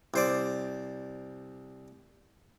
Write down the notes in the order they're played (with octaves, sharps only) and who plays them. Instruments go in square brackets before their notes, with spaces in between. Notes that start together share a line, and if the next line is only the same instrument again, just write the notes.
[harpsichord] C2 C5 D5